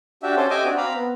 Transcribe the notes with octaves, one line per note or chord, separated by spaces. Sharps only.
D4 F#4 G4 E5
C#4 A4 C5
G4 D#5 E5 G#5 D6
C4 D4 F#4
C4 F5 A#5 B5
B3